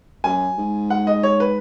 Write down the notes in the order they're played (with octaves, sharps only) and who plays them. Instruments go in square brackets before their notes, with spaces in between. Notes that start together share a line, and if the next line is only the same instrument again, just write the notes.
[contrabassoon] F#2 [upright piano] G#5
[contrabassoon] G#2
[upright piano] F#5
D#5
C#5
B4